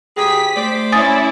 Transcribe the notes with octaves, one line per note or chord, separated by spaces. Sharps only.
D2 G4 G#4 G5 B6
A3 C5 D5
C#4 E4 G#5 D#6 A6